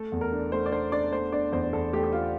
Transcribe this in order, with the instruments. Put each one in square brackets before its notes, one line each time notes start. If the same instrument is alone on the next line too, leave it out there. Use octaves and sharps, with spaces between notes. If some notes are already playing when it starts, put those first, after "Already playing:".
Already playing: [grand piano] A3 [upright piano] A4
[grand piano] E2
[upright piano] A#4
[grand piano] D4
[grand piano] A3 [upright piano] C5
[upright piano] D5
[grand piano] D4 [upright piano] C5
[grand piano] D4 [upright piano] D5
[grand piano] A3 [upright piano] C5
[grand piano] D4 [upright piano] D5
[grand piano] E2 [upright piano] C5
[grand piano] E2 [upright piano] A4
[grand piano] A3 [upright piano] G4
[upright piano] G4
[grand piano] A3 [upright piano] F4